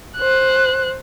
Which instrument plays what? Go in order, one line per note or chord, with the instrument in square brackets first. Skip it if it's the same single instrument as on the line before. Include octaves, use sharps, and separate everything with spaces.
[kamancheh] C5 F#6